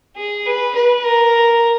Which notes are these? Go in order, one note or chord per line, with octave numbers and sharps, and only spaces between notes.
G#4
B4
B4
A#4